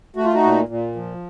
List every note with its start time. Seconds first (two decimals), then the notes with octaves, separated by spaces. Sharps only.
0.16 A3 F#4
0.25 F4
0.34 D#4 F#4
0.43 A#2
0.68 A#2
0.96 F3